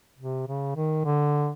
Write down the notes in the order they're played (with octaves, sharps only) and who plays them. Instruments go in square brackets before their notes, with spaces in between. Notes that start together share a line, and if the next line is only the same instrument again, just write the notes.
[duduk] C3
C#3
D#3
D3